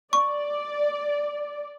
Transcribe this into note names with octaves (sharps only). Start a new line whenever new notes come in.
D5 C#6